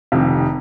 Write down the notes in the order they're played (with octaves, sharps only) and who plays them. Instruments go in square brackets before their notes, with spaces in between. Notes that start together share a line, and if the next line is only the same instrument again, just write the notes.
[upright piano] F1 F2 C3 D#3